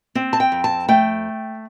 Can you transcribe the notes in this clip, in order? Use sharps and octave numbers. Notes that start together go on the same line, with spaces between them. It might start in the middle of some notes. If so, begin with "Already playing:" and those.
C4
A5
G5
F2
A5
A3 G5